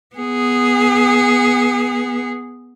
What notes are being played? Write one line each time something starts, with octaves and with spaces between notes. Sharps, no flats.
B3 G#4